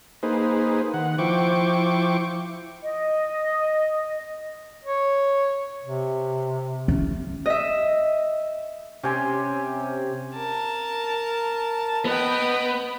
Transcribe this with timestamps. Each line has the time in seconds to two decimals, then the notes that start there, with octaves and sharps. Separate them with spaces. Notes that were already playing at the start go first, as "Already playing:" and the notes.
0.23 A#3 D#4 G#4 B4 C5
0.94 D#3 F#5
1.18 F3 E4 C5 G5 C#6 D6
2.82 D#5
4.85 C#5
5.83 C3
6.88 C#4
7.46 D#5 E5
9.03 C3 C#4 G4 G#5 C6
10.36 A#4 A5
12.05 B3 D#5 G5